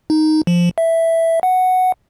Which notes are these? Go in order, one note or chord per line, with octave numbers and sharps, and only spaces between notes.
D#4
F3
E5
F#5